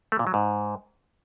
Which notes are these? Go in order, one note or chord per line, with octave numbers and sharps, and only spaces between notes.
A3
A#2
F#3
G#2